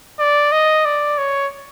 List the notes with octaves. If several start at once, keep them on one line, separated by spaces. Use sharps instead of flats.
D5
D#5
D5
C#5